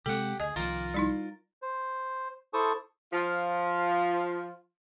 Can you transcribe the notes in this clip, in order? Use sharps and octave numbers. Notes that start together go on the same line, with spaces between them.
C3 G#3 C4 G4 A4 F#5
D2 G#4 D#5 G#5
C2 D#3 F3 F4 A#4
G3 D#4 E4
C5
E4 A4 C5 A5 C#6 D#6
F3 F4